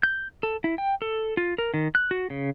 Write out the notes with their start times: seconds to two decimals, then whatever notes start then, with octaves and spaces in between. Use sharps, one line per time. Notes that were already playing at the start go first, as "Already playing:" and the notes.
0.03 G6
0.43 A4
0.64 E4
0.78 G5
1.02 A4
1.37 F4
1.58 A#4
1.74 D#3
1.95 F#6
2.11 F#4
2.30 C#3